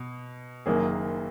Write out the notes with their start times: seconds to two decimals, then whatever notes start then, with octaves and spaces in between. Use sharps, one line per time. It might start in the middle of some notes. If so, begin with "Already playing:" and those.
Already playing: B2
0.66 F#1 F#2 D#3 F#3 A#3 G#4